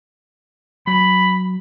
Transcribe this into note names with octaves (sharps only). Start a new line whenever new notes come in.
F#3 B5